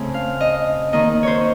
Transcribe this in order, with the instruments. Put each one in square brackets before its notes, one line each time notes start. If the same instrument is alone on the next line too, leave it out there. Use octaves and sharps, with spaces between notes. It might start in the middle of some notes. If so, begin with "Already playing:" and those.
Already playing: [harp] C#3 A3 C4
F5
D#5
D#3 A#3 D#4 D#5
C5 C#5